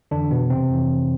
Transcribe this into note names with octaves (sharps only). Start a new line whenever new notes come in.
F2 D3 E3 D4
B2 B3
C3 C4
F2 E3